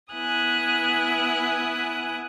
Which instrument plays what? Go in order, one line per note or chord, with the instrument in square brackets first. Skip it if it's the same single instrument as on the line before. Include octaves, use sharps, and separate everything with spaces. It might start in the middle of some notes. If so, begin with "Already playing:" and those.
[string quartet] B3 E4 G#5 D#6 F#6